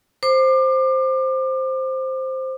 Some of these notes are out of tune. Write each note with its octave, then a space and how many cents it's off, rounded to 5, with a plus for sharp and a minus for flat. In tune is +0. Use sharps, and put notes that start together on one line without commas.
C5 +0 D6 +30